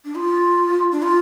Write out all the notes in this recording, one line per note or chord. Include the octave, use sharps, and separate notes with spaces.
D4
F4
D4
F4